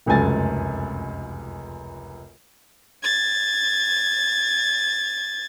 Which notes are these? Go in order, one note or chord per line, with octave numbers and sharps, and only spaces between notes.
F1 C#2 F#2 A3 G#5 A6
G#6 A6